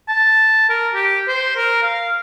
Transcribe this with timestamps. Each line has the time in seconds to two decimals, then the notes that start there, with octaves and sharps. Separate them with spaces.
0.08 A5
0.69 A#4
0.94 G4
1.28 C5
1.56 A#4
1.83 F5